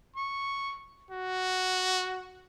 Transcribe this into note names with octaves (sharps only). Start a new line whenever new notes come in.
C#6
F#4